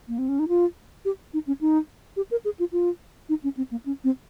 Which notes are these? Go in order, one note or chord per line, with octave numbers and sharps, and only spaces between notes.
A#3
C4
C#4
D#4
F4
G4
D#4
C#4
D#4
G4
A#4
G#4
F4
F4
D#4
C#4
C4
A#3
C#4
C4